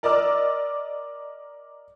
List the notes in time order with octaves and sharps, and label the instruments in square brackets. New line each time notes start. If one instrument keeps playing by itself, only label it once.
[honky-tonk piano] A#4 D5 D#5 D6 E6 F6